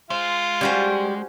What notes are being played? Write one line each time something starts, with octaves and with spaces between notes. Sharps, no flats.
G#3 F4 C5
G3 C#4 F#4 C5